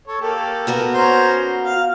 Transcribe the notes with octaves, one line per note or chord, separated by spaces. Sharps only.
A4 C#5
A#3 G4 A4
B3 F#4 A#4
C#4 C5 A#5
F5